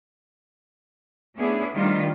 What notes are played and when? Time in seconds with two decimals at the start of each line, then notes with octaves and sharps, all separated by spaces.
1.36 A3 B3 C#4 D4 E4 G#4
1.74 D#3 F3 G3 A3 D4 F4